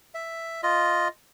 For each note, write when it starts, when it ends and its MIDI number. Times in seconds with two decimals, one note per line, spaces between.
0.14 0.61 76
0.63 1.08 65
0.63 1.08 75